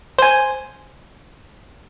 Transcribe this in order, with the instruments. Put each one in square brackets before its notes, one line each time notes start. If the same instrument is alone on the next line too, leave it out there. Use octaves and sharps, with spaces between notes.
[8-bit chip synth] C5 G#5